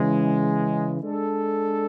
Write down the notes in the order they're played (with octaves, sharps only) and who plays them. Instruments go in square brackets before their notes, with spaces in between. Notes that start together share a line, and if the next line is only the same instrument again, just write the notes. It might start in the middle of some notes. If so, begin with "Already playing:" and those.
Already playing: [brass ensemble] C#3 E3 G#3
G#3 D4 A4